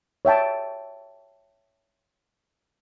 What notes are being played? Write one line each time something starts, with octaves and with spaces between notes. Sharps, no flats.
C#5 E5 G5 A5